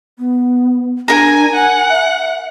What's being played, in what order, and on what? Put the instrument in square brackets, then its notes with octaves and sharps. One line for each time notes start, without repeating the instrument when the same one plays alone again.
[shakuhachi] B3
[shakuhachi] D4 [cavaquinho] A#4 A#5 [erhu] G#5
[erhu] F#5 [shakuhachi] G#5
[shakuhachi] E5